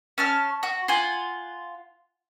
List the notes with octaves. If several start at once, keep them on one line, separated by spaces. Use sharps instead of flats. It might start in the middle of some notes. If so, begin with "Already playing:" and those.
C#4 A5 F6
F#4
F4 F#5 G#5